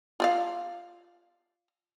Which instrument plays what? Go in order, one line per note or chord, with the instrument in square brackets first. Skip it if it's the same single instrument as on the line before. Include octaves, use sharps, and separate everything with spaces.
[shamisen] F4 D5 F5